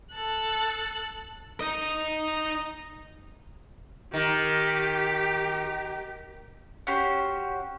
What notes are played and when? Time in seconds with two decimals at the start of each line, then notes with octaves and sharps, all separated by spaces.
0.14 A4 F#6
1.60 D#4 D#5
4.14 D#3 G4
6.87 C#4 F#4 G4 C5